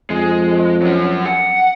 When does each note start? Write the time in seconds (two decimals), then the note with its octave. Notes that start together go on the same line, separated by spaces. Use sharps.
0.10 F2 G#3
0.82 F#3 A#4
1.25 F#5